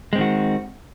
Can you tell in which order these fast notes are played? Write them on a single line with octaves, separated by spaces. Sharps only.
G#3 C4 D#3 F#4